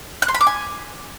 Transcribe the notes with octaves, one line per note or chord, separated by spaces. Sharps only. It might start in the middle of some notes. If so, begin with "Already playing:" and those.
F#6
C6
B5
D6
G#5